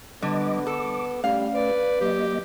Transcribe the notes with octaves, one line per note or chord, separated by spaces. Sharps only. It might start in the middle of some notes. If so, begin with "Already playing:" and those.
D3 G3 B3 D#5 D6
A4 D6
G3 A3 C#4 F5
B4 D5
F#3 A#3 G4 D#5